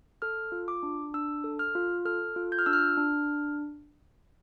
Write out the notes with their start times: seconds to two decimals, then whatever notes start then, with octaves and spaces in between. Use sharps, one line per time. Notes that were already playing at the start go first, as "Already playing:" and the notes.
0.22 A4 F6
0.52 F4
0.68 D6
0.83 D4
1.14 D4 E6
1.44 A4
1.59 F6
1.75 F4
2.05 A4 F6
2.36 F4
2.52 G6
2.59 F6
2.66 D4 E6
2.73 F6
2.97 D4